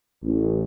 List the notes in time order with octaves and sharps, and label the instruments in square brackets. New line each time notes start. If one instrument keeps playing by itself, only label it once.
[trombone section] A1